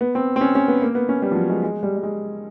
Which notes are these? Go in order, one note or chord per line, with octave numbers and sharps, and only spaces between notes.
B3
C4
C4
C#4
C#4
B3
A#3
B3
C#4
G3
F3
F#3
G#3
G#3
G3
G3
G#3